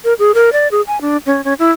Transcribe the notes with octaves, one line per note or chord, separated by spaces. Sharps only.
A#4
G#4
A#4
D5
G#4
G#5
D4
C#4
C#4
E4